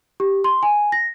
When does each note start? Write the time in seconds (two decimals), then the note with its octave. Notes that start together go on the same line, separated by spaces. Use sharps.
0.20 G4
0.44 C6
0.63 G#5
0.92 A#6